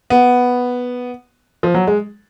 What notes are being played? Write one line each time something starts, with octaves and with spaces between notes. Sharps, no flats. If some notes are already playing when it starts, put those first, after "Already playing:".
B3
F3
F#3
G#3